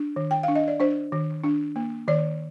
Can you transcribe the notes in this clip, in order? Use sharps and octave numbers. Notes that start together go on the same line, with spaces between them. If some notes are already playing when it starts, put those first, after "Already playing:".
Already playing: D4
D#3
G5
D4 F5
D#5
D5
D4 C5
D#3
D4
A#3
D#3 D5